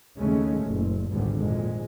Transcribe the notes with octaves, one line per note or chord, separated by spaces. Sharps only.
D#2 C#3 G#3 A3 C#4
F#1 A#2
G#1 C#2 G#2 B2 D3 G3
F2 A#2 G#3